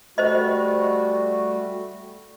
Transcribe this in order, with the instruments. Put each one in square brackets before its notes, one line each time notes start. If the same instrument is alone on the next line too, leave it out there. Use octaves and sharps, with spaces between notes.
[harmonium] G3 A3 F#4 [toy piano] C5 D#5